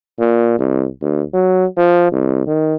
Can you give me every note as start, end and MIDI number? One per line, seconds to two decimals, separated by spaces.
0.19 0.57 46
0.59 0.86 36
1.02 1.23 38
1.34 1.65 54
1.77 2.12 53
2.12 2.45 36
2.47 2.75 51